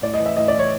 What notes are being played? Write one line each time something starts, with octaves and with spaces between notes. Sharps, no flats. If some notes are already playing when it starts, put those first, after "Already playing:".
A2 D5
D#5
E3
E5
A2 D#5
D5
E3
C#5